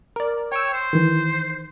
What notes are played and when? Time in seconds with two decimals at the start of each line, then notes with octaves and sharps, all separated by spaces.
0.16 A#4 D5
0.52 C#5 G5 E6
0.73 C5
0.93 D#3 E3